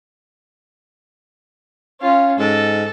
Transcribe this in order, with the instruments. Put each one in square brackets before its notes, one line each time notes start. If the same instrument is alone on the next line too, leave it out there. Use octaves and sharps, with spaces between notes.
[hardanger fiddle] C#4 F4
[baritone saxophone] G#2 [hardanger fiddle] A4